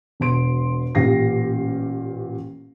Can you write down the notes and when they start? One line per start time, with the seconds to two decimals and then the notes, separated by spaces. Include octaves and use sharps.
0.20 E1 B2 C6 D7
0.95 A1 A#2 G4 F5 A#6 C7